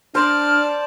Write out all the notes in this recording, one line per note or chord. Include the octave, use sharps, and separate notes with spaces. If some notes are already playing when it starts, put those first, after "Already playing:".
D4 C5 D5 A5 F6